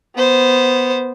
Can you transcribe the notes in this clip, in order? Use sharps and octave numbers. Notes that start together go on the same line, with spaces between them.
B3 C5